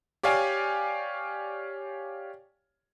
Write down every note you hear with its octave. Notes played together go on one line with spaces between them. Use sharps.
G4 C#5 D5 F5 G5 G#5